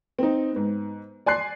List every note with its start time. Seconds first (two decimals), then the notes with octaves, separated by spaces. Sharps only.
0.19 C4 D#4
0.52 G#2 B3
1.26 D5 G#5 C6 F#6 C7